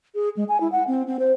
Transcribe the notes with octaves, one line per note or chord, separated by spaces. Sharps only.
G#4
G#3
G#5
E4
F#5
C4
C4
C5